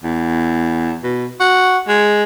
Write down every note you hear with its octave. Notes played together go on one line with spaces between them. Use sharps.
E2
B2
F#4
G#3